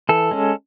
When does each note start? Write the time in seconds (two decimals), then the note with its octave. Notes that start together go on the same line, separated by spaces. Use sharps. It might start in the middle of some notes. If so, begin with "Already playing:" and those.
0.09 E3 A4
0.31 G#3 C#4